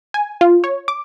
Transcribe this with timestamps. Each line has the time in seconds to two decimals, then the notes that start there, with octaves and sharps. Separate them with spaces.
0.14 G#5
0.41 F4
0.64 C#5
0.88 D6